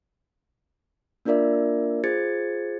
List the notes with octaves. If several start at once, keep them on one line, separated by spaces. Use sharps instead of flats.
A#3 D4 F4 A#4 D5 E5
F4 G#4 C5 G#6 A6 C#7